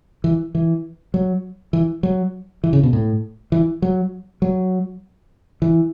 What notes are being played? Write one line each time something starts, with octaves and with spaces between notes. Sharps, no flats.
E3
E3
F#3
E3
F#3
E3
C#3
B2
A2
E3
F#3
F#3
E3